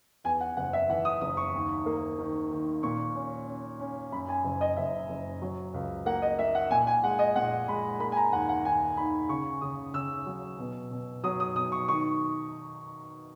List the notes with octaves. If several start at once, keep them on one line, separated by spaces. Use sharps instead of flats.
E2 G#5
F#5
F#1 F#5
E5
E3 F#5
D#6
F#1 D#6
C#6
D#2
A#3
D#3
D#3
A#2 C#6
C#4
C#4
C#4
F#2 B5
G#5
F#1
D#5
F#1 E5
F#1
F#3
C#2
A#3 F#5
D#5
A#3 E5
F#5
A#2 G#5
G#5
G#3 F#5
D#5
A#2 F#5
G#3 B5
A#3 B5
G#5
A#5
D#2 F#5
F#5
D#2 G#5
D#3 B5
C#3 C#6
C#3 D#6
C#3 E6
F#3
B2
B2
F#3 D#6
D#6
B2 D#6
C#6
D#3 C#6